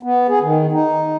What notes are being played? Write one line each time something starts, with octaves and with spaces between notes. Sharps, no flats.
B3
G#4
D#3
D#4